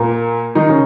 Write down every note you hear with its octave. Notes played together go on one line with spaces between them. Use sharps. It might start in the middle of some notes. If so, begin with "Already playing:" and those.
Already playing: A#2 A#3
D#3 D#4
C#3 C#4